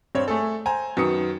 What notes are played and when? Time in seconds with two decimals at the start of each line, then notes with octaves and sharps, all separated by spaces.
0.15 G2 C4 C#5
0.28 A3 G#4 A4
0.66 C5 G#5 A#5
0.97 F#2 D#3 B3 D#6 C#7